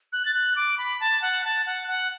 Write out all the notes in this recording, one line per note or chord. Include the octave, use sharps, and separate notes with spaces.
F#6
A6
F#6
D6
B5
A5
F#5
A5
F#5
F#5